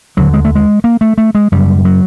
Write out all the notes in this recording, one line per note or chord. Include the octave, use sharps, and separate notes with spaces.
D#2 D3 F#3
G#3
A3
G#3
A#3
A3
A3
G#3
F#2 C#3 G3
F#3